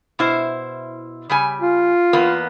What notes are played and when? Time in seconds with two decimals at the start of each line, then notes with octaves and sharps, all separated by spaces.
0.19 B2 E4 C5
1.29 C#3 G3 G#5
1.61 F4
2.13 E2 A#3 B3